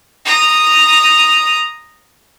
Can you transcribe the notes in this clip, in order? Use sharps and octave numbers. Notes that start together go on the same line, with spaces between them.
A#5 D#6